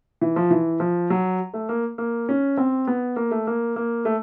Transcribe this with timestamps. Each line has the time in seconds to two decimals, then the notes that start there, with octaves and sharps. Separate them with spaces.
0.21 E3
0.36 F3
0.51 E3
0.80 F3
1.10 F#3
1.54 A3
1.69 A#3
1.98 A#3
2.29 C#4
2.58 C4
2.87 B3
3.16 A#3
3.31 A3
3.47 A#3
3.76 A#3
4.05 A3